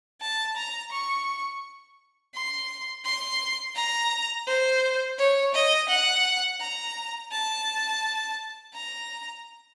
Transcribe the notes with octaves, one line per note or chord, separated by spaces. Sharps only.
A5
A#5
C#6
C6
C6
A#5
C5
C#5
D#5
F#5
A#5
A5
A#5